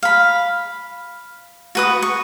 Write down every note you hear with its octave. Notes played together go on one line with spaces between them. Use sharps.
F5 B5
F#4 B4 D#6
C#6